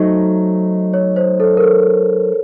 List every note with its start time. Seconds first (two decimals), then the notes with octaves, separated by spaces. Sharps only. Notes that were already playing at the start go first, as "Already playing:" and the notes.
Already playing: F#3 A3 D#4 C5
0.94 C#5
1.16 C5
1.40 A4
1.57 A#4
1.62 A4